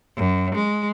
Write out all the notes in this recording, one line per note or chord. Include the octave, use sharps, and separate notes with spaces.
F#2
G#3